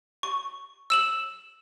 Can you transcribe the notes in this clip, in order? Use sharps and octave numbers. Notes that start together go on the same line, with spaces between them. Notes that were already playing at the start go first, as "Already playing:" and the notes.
C#6
E6 E7 F#7